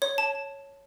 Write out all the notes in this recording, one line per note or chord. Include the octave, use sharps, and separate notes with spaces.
C#5
A5